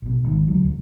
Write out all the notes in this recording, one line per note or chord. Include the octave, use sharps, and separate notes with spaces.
A1 B2
G#1 G#2 D#3
D2 F#3
D1 C#2